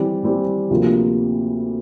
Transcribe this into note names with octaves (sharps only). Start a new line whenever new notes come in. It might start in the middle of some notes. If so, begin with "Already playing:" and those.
Already playing: E3 G3 C4 G4
E3 G3 C4 G4
D2 C3 F3 A#3 F4